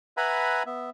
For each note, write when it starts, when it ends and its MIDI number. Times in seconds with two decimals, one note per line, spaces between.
0.17 0.63 71
0.17 0.63 76
0.17 0.63 78
0.17 0.63 80
0.17 0.63 82
0.17 0.63 83
0.66 0.90 59
0.66 0.90 76